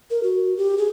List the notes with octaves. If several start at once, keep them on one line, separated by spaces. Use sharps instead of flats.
A#4
F#4
G4
G#4